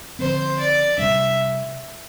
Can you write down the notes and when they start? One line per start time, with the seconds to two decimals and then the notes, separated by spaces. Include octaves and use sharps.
0.19 D3 F3 C4 C5
0.59 D5
0.98 C3 G3 D4 E5